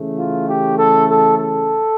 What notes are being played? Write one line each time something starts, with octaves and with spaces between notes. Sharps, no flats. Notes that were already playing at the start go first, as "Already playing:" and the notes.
Already playing: C#3 E3 A3
F4
G4
A4
A4
A4